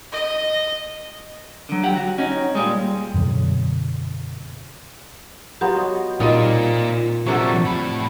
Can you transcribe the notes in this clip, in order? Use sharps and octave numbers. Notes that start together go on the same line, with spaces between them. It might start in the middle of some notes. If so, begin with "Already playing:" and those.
D#5
D3 F#3
G4 F#5
F#4
C#4 D#4
A#2 G3 G#3
F#2 B2 D3 F#3
F#3 B3 F4 G4
D#5
A#2 G3 C4 D#4 F4 D5 D#5
C3 F#3 G3 D4 A4 F#5 C#6
A2 B5